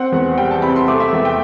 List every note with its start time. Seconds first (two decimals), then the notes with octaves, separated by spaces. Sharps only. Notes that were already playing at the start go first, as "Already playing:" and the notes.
Already playing: C4 F#5
0.12 E2
0.38 G3 G5
0.51 A5
0.62 C3 B5
0.76 C6
0.88 A3 D6
1.00 E5
1.13 E2
1.25 G5